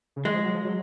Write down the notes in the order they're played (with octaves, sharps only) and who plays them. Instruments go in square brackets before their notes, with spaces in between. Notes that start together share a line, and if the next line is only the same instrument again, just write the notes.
[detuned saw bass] C#3
[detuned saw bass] D#3 [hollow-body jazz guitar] G#3
[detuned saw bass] F3
F#3
F3
F#3